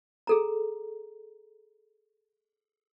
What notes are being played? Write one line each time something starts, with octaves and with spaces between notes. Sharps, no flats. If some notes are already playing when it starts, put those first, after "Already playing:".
G#4 A4 A#5